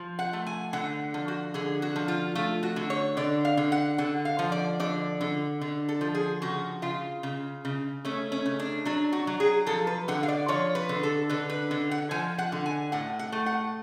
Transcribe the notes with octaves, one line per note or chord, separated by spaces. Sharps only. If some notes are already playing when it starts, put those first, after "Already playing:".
Already playing: F3
F#5
A3
G#5
D3 F#5
F3
F#4
D3 G#4
F#4
F3
F4
A3 F4
F#4
D3
C#5
D3 D5
F5
D3
F#5
D3 F#5
F5
F3
D5
D3 D5
D3
D3
A4
F3
G#4
C#3 F#4
C#3 F4
C#3
C#3
A3 C#4
C#4
C#3
D4
F#3 D4
F#4
F#3
G#4
F3 A4
B4
D3 F#5
F5
D5
F3 C#5
B4
D3
A4
D3 B4
B4
D3
F#5
F3 G#5
F#5
D3
G#5
A2 F#5
F#5
A3
F#5